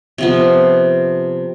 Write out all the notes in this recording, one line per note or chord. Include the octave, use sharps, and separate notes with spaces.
C3 F3 B3